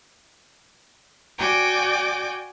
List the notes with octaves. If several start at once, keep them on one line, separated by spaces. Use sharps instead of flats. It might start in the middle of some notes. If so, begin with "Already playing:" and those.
F#4 D5 G5 G#5 D6